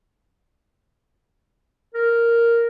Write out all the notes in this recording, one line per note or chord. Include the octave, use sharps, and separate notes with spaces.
A#4